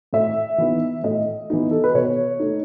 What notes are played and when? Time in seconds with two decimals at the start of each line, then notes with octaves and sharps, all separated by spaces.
0.13 A2 E5
0.58 E3 B3 D#4
1.04 A2 D#5
1.50 E3 B3 D#4
1.71 A4
1.84 B4
1.94 B2 C#5
2.40 A3 D#4